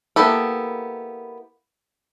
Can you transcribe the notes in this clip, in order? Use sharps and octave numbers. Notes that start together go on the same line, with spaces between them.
A#3 B3 E4 G4 A4